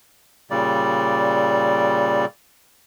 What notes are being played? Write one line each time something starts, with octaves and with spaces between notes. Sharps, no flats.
A#2 C#3 G3 D5